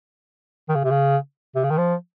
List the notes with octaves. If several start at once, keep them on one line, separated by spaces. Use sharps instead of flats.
D#3
C#3
C3
C#3
C3
C#3
D#3
F3